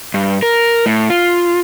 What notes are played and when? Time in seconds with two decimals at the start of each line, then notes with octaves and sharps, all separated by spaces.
0.14 G2
0.43 A#4
0.86 A2
1.10 F4